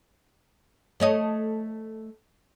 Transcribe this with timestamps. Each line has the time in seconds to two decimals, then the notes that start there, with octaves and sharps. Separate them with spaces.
1.00 A3 C#5 D#5